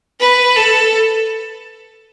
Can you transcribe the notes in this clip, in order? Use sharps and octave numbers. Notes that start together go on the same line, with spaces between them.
B4
A4